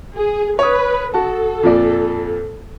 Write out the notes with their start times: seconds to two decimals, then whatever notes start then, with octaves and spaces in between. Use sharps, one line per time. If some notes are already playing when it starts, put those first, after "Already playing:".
0.14 G#4
0.59 B4 C#5 D#6
1.14 F#4 A4 A5
1.63 F2 A#2 D5